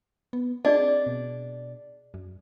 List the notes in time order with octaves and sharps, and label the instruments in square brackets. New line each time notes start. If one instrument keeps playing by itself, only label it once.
[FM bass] B3
[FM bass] C4 [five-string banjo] D4 [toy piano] G#4 D5 D#5
[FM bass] B2
F#2